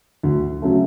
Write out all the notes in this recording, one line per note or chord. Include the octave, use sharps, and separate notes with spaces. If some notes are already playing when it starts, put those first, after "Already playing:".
D2
C#3 F#3 A3